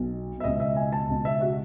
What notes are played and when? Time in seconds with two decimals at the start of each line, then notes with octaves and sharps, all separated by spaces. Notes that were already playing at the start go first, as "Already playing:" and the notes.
Already playing: B1 B2
0.40 E5
0.44 C#2 B2 D#5
0.60 E5
0.76 G#5
0.93 A5
1.09 C#2 B2
1.25 E5
1.41 F#4